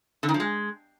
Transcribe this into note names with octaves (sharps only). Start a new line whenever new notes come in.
D3
D#3
F3
G#3